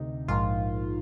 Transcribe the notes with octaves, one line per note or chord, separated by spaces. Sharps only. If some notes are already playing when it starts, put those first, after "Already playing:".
Already playing: D2 C3 D#4
A#1 G#2 D#3 F4